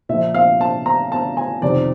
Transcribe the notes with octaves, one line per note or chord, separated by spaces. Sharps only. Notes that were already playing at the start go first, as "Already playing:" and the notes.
A#2 F3 E5
F5
A5
A#5
A5
G#5
F2 C3 D#3 D5